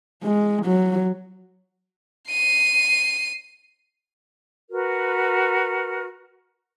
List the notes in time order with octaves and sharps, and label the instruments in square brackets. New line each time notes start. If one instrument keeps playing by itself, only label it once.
[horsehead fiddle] G#3
F#3
[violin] C7 D#7
[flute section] F#4 A#4 B4